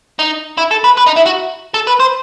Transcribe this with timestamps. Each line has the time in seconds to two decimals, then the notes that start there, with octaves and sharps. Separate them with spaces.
0.19 D#4
0.58 E4
0.71 A4
0.84 B4
0.97 B4
1.06 D#4
1.16 E4
1.26 F#4
1.74 A4
1.87 B4
2.00 C5